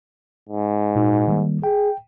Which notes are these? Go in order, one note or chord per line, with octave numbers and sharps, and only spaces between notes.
G#2
A#2 D#4 F#4
D#3 G3 A#3
G#4 G5